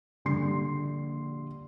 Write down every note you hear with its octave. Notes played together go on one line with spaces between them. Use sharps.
A#1 D3 G3 C6 C7